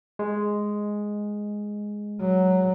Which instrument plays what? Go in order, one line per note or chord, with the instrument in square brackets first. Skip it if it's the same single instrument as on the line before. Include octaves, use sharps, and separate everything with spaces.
[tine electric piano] G#3
[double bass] F#3